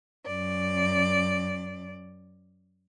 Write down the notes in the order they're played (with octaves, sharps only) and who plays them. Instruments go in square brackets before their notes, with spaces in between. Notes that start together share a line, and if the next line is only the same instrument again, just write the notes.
[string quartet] F#2 D5